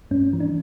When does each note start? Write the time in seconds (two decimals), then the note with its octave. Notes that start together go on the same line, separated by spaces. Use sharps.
0.11 G2 C#4
0.33 E3
0.40 D4